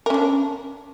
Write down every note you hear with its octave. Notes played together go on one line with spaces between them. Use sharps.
C#4 D4 A#4